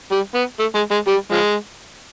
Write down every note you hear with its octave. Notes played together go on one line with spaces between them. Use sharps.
G3
B3
A3
G#3
G#3
G3
F3 G#3